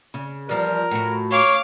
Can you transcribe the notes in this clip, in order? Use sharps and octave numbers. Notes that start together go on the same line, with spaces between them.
C#3
E2 F3 G3 A#4
A2 F#4
C#5 F5 D6